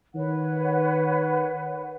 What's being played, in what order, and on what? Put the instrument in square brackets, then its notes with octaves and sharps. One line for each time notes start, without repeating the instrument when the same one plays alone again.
[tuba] D#3 [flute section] B4 C#5 F#5